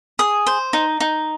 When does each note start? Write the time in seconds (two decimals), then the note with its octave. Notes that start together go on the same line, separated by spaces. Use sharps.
0.19 G#4 D#6
0.47 C5
0.73 D#4
1.00 D#4